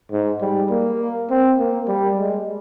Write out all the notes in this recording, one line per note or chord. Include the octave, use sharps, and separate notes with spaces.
G#2
G3
A#3
C4
A#3
G3
G#3